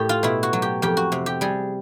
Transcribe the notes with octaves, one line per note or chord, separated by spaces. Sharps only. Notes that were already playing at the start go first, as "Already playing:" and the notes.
Already playing: A2 G4
F4
B2 E4
F#4
F#3
G4
F2 G4
F#4
C3
G4
G3 G#4